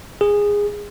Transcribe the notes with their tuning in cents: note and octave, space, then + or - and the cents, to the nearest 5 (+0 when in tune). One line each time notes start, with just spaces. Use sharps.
G#4 -15